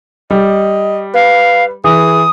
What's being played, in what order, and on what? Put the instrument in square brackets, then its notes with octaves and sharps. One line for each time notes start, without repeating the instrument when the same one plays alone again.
[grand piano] G3 [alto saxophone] D#5
[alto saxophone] B4 [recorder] F5
[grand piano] E3 [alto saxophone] G#4 [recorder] D#6